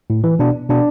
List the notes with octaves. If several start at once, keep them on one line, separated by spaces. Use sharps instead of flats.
A2
E3
B2 D4
B2 D4